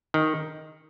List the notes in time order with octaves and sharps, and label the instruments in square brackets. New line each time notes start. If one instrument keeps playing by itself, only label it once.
[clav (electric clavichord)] D#3